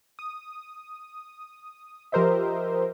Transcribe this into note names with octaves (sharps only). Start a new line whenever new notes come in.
D#6
F3 G4 A#4 C5 D#5 E5